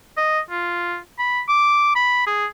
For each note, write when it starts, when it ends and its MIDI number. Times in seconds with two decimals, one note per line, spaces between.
0.17 0.40 75
0.51 0.97 65
1.19 1.41 83
1.48 1.91 86
1.96 2.26 83
2.27 2.46 68